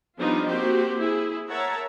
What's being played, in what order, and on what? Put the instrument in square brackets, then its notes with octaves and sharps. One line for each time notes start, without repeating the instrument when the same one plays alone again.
[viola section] F3 G3 B3 D4 D#4 F4
A#3 C4 F#4 G4 C5
E4 G#4
A#4 C#5 E5 F#5 A5 A#5